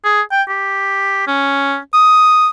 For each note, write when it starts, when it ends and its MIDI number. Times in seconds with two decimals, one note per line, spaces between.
0.04 0.22 68
0.32 0.42 79
0.48 1.26 67
1.27 1.77 61
1.93 2.49 87